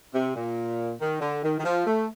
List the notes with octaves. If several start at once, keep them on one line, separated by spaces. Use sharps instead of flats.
C3
A#2
D#3
D3
D#3
D#3
F3
A3